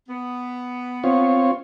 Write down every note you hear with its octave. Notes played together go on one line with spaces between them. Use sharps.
B3
C4 F4 C#5